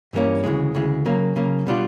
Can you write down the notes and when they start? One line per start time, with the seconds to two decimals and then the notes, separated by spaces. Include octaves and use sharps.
0.13 G2 E3 G3 A#3 C#4
0.44 D2 C#3 E3 G#3
0.75 D2 C#3 E3 G#3
1.05 C#3 F#3 A#3
1.36 C#3 F#3 A#3
1.67 B2 G3 B3 D4 F4